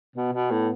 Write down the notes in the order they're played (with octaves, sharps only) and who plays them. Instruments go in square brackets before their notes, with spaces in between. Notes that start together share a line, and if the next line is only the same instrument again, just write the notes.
[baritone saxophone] B2 [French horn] B3
[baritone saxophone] B2
A2